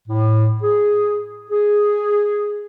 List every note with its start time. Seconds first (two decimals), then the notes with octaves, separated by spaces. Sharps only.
0.08 A2
0.62 G#4
1.50 G#4